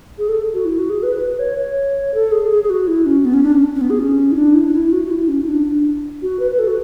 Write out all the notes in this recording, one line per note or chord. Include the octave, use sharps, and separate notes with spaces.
G#4
A4
F#4
E4
F#4
G#4
B4
B4
B4
C#5
C#5
A4
G#4
G#4
G#4
F#4
E4
C#4
B3
C#4
D4
C#4
C#4
B3
G#4
C#4
E4
D4
E4
D4
E4
F#4
F#4
E4
C#4
E4
D4
D4
F#4
B4
B4
A4
F#4